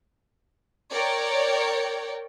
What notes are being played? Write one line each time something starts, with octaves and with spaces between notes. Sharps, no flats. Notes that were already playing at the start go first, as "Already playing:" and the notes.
A#4 C#5 D5 G5